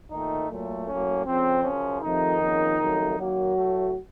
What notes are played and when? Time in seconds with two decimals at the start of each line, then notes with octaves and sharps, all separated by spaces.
0.11 A#2 D#3 A3 D#4
0.49 A#2 F#3 A3
0.87 A2 F#3 A#3 C#4
1.25 F2 C#3 F3 C4
1.64 F#2 C#3 F3 C#4
2.02 F2 C3 D#3 F3 A3 D#4
2.40 F2 C#3 F3 A#3
2.78 F2 C#3 F#3 A3
3.16 F#2 D#3 F#3 A#3 F#4
3.55 A2 A3